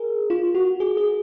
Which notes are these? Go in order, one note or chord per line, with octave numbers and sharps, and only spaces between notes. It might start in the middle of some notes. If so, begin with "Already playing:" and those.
Already playing: G#4 A#4
F4
F#4
G#4
G#4